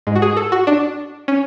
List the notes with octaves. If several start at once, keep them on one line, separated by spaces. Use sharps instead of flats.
G#2 G#3
F#4
G#4
A4
F#4
D4
C#4